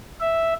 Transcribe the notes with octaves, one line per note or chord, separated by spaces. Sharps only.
E5